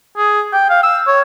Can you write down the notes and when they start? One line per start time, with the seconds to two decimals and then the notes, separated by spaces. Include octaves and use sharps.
0.17 G#4
0.53 G5
0.70 F5
0.83 E6
1.07 C#5